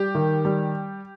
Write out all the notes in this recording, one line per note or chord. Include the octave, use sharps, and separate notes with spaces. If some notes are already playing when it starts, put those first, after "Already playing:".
Already playing: G3 G4
D#3
G3